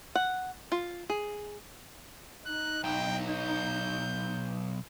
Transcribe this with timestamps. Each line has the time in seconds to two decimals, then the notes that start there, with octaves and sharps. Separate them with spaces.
0.15 F#5
0.72 F4
1.10 G#4
2.46 D#4 F#6
2.84 B1 G5
3.29 G6